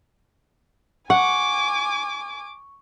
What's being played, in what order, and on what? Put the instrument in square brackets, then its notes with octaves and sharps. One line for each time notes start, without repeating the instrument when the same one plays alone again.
[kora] F#5 [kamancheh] G#5 D6 [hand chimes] C#6